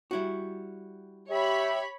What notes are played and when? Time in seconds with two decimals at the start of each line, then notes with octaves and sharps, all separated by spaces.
0.11 G3 E4 F#4
1.30 G4 C#5 E5 B5